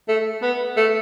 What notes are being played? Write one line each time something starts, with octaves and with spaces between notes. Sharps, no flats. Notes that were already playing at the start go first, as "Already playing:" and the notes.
A3
B3
A3